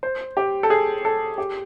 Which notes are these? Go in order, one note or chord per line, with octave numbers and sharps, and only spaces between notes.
C5
G4
A4
G#4
A4
G4